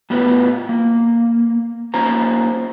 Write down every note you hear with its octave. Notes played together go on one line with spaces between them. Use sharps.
A2 B3 F4 B4
A#3
A#3 C#4 F4 C5 A#5